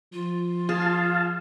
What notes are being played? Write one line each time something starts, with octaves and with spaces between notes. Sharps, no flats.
F3 F4
G#4 F5 A5